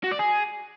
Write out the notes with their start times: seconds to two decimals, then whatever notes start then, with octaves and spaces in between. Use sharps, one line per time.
0.04 F#4
0.12 D5
0.19 G#4